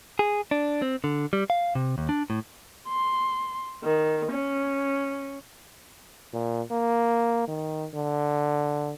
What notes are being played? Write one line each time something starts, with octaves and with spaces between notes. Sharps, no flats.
G#4
D4
C4
D3
G3
F5
C3
D#2
D4
A2
C6
D#3
C#4
A#2
A#3
D#3
D3